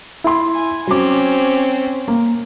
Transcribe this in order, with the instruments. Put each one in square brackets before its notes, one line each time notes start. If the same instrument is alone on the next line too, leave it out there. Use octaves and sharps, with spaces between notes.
[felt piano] E4 C6
[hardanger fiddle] G#5
[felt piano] F#3 D6 [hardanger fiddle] C4 C#4
[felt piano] A#3